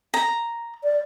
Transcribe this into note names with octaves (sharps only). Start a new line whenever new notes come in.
A#5
D5